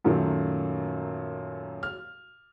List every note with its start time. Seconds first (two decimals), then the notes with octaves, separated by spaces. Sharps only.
0.04 F#2 A#2 D#3 F#3 A3
1.83 F6